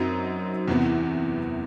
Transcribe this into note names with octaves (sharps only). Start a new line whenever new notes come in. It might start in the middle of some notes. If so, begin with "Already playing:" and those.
Already playing: F#2 F#3 C4 D#4
E2 C3 E3 B3